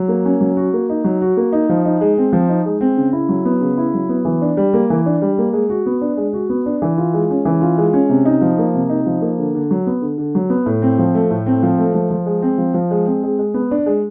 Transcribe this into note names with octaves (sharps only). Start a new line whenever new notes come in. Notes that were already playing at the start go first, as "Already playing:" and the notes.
Already playing: F#3
A#3
C#4
F#3
F#4
A#3
D#4
F#3
F#4
A#3
D#4
F3
D#4
G#3
C4
F3
D#4
G#3
C4
C#3
E4
F#3
B3
C#3
E4
F#3
B3
E3
D4
G3
A#3
E3
D4
G3
A#3
G#3
F#4
B3
D4
G#3
F#4
B3
D4
E3
F4
G#3
C#4
E3
F4
G#3
C#4
C3
D#4
F3
A#3
C3
D#4
F3
A#3
D3
D3
F#3
B3
D3
D3
F#3
B3
A2
C4
F3
A3
A2
C4
F3
A3
F3
F3
G#3
C4
F3
F3
G#3
C4
G#3
G#3
B3
D4
G#3